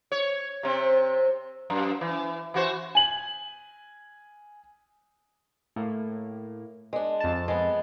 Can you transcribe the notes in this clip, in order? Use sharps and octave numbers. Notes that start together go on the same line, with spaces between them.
C#5
C3 C4
F#2
E3
E3 F#4 C5
G#5 F#7
A2 A#3
G#3 D4
F2 A5
G#3 B3